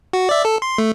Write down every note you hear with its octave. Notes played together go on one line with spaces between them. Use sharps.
F#4
D5 E5
A4
C6
A3